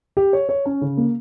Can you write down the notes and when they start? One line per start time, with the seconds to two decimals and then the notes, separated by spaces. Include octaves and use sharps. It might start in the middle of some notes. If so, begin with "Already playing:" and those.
0.17 G4
0.33 C#5
0.49 C#5
0.66 C#4
0.81 C#3
0.97 A#3